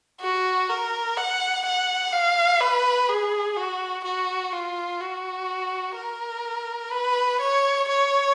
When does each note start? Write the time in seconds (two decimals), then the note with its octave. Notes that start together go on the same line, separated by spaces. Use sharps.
0.21 F#4
0.69 A#4
1.17 F#5
1.65 F#5
2.13 F5
2.61 B4
3.09 G#4
3.57 F#4
4.04 F#4
4.53 F4
5.00 F#4
5.96 A#4
6.92 B4
7.41 C#5
7.88 C#5